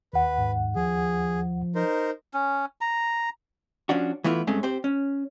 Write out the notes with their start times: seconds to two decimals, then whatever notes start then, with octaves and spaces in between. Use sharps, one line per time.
0.13 D#2 B4 F#5
0.38 G#2
0.76 F3 G#4
1.75 D#4 A#4 C5
2.34 C#4
2.81 A#5
3.89 F3 C#4 D4 F#4
4.24 E3 A3 B3 E4 F4
4.47 G2 G#3 A3 C4 C#4
4.63 C4 G4 C5
4.84 C#4